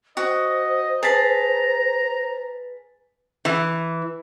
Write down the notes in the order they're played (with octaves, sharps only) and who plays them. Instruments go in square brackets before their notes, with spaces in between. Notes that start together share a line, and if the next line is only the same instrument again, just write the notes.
[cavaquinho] F#4 [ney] C5 [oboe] D#5
[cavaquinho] G#4 A5 [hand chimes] B4 A6 B6 [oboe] A#5
[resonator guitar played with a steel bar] E3